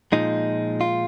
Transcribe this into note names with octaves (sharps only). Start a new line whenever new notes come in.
A#2 F3 G#3 D#4
F4